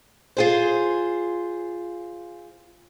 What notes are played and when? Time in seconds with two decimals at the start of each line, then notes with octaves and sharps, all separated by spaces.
0.37 F4 G#4 C5